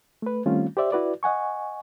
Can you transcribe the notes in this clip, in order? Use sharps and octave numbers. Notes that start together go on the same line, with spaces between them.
A3 B4
D#3 G3 A3 C4 C#4 F4
G4 C5 D5 E5
E4 F#4 B4 D5
D#5 F#5 G#5 C#6